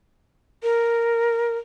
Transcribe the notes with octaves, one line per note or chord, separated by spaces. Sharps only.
A#4